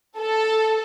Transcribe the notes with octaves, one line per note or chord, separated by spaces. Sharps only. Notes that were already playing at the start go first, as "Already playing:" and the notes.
A4